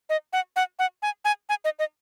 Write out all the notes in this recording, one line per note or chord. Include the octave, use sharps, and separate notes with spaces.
D#5
F#5
F#5
F#5
G#5
G#5
G#5
D#5
D#5